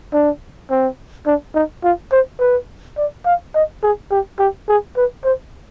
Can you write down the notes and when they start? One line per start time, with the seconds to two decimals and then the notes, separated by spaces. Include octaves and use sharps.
0.13 D4
0.70 C4
1.26 D4
1.55 D#4
1.84 F4
2.12 C5
2.40 B4
2.98 D5
3.26 F5
3.55 D#5
3.83 G#4
4.11 G4
4.39 G4
4.68 G#4
4.97 B4
5.24 C5